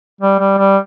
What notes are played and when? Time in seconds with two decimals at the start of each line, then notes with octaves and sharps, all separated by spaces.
0.21 G3
0.40 G3
0.58 G3